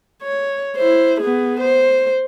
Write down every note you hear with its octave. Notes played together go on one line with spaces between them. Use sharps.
C#5
E4 C5
B3 G#4
C5